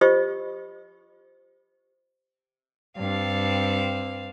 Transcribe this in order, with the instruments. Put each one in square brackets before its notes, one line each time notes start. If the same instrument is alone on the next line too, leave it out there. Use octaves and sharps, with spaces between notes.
[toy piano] F4 G4 C5 D#5 C#6
[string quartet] G2 C4 F5